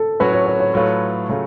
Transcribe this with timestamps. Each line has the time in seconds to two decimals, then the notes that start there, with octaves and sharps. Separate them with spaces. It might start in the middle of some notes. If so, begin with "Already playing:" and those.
Already playing: A4
0.20 A2 F#3 C#4 F#4 B4
0.33 C#5
0.46 C#5
0.60 C#5
0.74 A2 F#3 A3 F4 B4 C#5
1.29 C#3 F#3 A3 F4